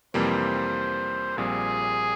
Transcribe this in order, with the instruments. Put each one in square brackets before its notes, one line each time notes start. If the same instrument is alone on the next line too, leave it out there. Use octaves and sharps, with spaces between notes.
[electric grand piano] F2 C3 E3 G3 A#3 [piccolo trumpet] C5
[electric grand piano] A#1 A#2 G3 C4 [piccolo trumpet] G#4